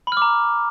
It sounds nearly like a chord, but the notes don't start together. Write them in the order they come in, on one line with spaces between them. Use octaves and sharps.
B5 F6 D6 A#5